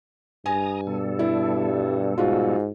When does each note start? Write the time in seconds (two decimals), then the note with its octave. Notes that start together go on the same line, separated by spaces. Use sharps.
0.46 G2 G#5 A#5 D#6
0.87 B2 G3 A4
1.19 E4
2.18 G#2 F4 F#4